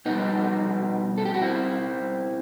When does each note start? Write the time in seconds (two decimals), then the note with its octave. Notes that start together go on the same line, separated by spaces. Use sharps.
0.06 B2 G3 B3 D#4
1.17 A4
1.25 G4
1.34 F#4
1.42 C4 E4